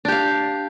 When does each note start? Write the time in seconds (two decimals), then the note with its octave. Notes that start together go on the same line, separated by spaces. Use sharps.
0.05 D4
0.08 G4
0.12 F5